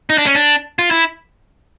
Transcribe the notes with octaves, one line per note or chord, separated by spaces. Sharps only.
D#4
D4
C#4
D4
F4
E4